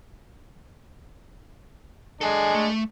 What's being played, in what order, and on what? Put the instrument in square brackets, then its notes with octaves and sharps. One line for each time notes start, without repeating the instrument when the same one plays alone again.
[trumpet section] G#3 D4 [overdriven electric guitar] A4 G#5
[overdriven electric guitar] A3